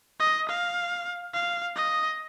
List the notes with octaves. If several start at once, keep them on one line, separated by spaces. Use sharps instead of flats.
D#5
F5
F5
D#5